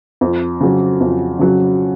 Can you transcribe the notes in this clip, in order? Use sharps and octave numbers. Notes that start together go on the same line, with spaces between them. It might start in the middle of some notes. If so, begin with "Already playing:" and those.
F2
C#3 F#3
F2
C#3 F#3